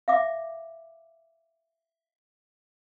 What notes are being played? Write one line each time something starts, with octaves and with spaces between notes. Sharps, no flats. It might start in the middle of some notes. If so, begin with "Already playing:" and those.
E5 F5 D6